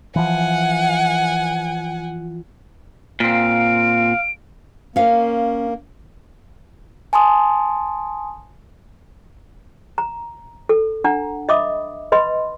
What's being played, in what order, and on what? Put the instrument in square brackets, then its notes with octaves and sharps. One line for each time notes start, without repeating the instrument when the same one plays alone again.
[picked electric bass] E3 F3 [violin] F#5 G#5
[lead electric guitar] A#2 C4 [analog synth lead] F5 [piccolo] D7
[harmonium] A#3 [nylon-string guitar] C#4 F5
[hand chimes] G#5 A5 C6 D#6
[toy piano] A#5
A4
D4 F#5 A#5
D#5 E5 B5 D6 D#6
B4 D#5 B5 C6